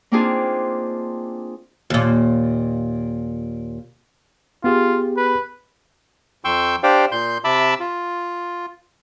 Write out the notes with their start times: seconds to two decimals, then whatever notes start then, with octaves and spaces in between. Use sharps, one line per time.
0.12 A#3 C4 D4 D#4 F4 G#4
1.90 D#2 A#2
4.64 B3 F4 G4 G#4
5.17 B4
6.45 F2 G5 C6 C#6 E6 G6
6.83 D4 G4 C5 D5 F5 G5
7.12 A#2 C6 G6
7.44 C3 E5 A5 B5 D6 E6
7.80 F4